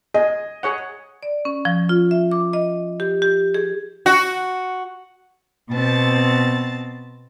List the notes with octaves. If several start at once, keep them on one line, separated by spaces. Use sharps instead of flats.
G#4 D#5
G#4 C#5 F#5
D5
C#4
F3
F4
E5
D6
D#5
G4
G4
G#4
F#4
B2 B3 C4 A5 A6